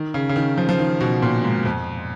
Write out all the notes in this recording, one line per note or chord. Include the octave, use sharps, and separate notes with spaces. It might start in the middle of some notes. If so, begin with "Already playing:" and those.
Already playing: D#3
C#3
C#3
D#3
F3
F3
D#3
B2
A#2
G#2
F2